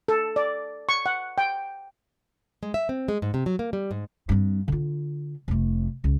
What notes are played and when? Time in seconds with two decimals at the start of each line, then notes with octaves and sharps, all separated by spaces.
0.08 A4
0.36 D5
0.89 C#6
1.06 F#5
1.38 G5
2.63 G#3
2.74 E5
2.89 C4
3.08 G#3
3.22 G#2
3.34 C3
3.46 F#3
3.59 A#3
3.73 G3
3.91 G#2
4.29 G2 C4
4.68 D3 F4
5.48 F1 A3
6.04 C#2